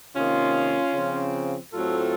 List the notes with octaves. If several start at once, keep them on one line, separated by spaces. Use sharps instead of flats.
C3 D#3 A#3 C#4 F4
C#3 F3 C4
A2 F#3 A3 C4 F4 A4